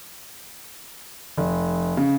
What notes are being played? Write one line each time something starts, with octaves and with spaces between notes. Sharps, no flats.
F1
C#3